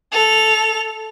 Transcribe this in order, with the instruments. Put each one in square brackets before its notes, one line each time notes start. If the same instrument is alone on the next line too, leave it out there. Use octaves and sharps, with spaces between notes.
[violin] A4 F7